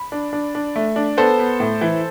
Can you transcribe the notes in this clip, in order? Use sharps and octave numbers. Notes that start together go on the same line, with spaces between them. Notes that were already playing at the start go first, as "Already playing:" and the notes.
Already playing: B5
D4
D4
D4
A3
D4
B3 A4 C5
B3
A2
E3